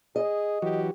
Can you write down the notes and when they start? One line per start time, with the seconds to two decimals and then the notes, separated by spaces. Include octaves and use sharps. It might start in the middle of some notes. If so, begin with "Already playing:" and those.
0.16 G#4 D#5
0.62 E3 F#3 F#4 G4